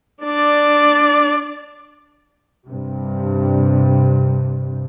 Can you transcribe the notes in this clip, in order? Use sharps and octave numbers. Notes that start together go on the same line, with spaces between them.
D4 D5
G2 C3